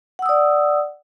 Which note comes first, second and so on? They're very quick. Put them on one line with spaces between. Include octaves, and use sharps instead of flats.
F#5 E6 D#6 D5